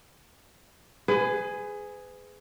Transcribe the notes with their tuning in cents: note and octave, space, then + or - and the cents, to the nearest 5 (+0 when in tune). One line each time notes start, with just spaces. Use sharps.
G#4 +0 B4 +35